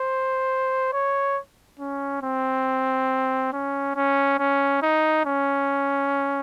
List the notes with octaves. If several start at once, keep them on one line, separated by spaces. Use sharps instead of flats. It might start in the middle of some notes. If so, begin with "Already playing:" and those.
Already playing: C5
C#5
C#4
C4
C#4
C#4
C#4
D#4
C#4